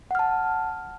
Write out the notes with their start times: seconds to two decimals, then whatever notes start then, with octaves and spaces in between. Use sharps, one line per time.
0.11 F#5
0.15 F6
0.19 A5